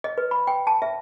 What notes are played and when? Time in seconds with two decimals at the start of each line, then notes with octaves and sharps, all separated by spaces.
0.04 D#5
0.18 B4
0.31 B5
0.47 G5
0.67 A5
0.82 E5